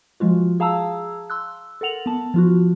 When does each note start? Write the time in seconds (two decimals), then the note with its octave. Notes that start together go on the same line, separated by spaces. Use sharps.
0.20 F3 G#3 F4 F#4
0.60 G#4 F5 A5 A#5 E6
1.30 C6 E6 F#6
1.81 A4 A#4 F#5 F7 F#7
2.06 B3 A5
2.34 F3 F4 F#4